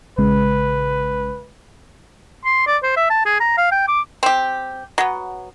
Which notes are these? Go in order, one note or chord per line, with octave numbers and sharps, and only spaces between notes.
A#1 C#3 G#3 B4
C6
D5
C5
E5
A5
G#4
A#5
F5
G5
D6
C4 G4
F#3 B3